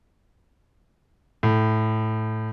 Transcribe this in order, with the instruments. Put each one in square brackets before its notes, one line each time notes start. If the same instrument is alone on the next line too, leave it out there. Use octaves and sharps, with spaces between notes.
[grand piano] A2